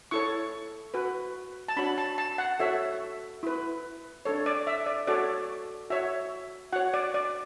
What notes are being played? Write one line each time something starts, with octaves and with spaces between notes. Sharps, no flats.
E4 A4 C#5 C#6
F#4 B4
A5
D4 F#4 C#5 B5
A5
A5
F#5
F#4 A4 C#5 E5
E4 B4
D4 A4 C#5
D5
E5
D5
F#4 A4 C#5 D5
F#4 C#5 E5
F#4 C#5 F#5
D5
D5